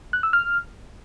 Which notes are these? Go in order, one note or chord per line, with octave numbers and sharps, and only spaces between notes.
F#6
E6
F6